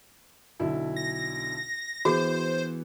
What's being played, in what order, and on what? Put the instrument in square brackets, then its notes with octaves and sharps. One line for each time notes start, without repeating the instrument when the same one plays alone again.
[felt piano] B1 D3 E4
[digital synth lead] A#6
[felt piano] E3 B3 [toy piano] F#4 G#4 [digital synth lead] C5